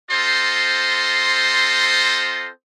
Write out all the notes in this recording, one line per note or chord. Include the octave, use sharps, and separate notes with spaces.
C4 F4 A4 C5 D#5 C6